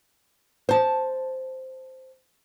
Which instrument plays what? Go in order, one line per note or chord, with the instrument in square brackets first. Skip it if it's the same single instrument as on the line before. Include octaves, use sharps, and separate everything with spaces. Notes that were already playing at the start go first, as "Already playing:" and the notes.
[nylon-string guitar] C5 A5